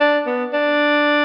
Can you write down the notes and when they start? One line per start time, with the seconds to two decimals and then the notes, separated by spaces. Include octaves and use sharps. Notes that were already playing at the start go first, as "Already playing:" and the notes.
0.01 D4
0.26 B3
0.53 D4